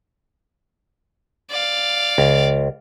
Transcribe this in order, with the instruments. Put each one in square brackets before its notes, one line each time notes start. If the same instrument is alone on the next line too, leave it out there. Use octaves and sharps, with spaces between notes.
[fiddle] D5 F5
[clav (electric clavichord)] C#2